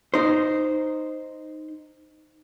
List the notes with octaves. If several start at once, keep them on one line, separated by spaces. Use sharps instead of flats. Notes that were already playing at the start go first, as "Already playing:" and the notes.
D#4 C5